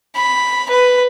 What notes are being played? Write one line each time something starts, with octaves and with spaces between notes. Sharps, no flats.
B5
B4